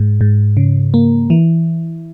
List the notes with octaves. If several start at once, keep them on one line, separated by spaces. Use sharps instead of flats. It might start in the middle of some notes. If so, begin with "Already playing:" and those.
Already playing: G#2
G#2
C#3
A#3
E3